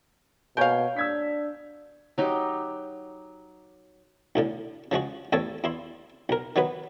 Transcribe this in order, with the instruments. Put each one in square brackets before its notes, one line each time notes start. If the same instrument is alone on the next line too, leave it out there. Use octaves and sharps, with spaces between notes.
[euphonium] B2 [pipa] A#4 F5 [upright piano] C#5 G#5 G6
[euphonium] D4 [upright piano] E6 G#6 B6
[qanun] F#3 D#4 G4
[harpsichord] B1 A2 D3
C#3 F3 G#3 F#4
A1 E2 C4 A4 C#5
E2 E4 C6
B1 A#4
D#3 F#3 B3 B4